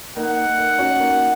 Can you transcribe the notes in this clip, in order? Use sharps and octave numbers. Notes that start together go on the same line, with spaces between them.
A#3 D#4 F#5
A#3 D#4
C#4 F#4
A#3 D#4